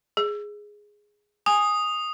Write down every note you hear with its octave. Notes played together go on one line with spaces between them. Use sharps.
G#4
G#5 D#6